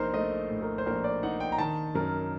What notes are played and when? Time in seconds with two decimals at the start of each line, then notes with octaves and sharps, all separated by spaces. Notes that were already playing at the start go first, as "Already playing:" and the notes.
Already playing: A#1 D#4 A#4 C5
0.14 A3 D#5
0.50 A2
0.62 A#4
0.78 C5
0.86 A#1 A#4
1.04 D5
1.23 D#4 F#5
1.40 G5
1.52 A#5
1.58 D#3 A5
1.95 F#2 A#4